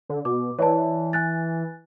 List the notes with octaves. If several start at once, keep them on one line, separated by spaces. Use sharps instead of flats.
D3
B2 D6
E3 C#5 D5 A5
G#5 F#6 A6